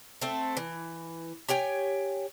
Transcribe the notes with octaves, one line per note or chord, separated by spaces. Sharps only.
A3 C4
E3
G4 C#5 G5 G#5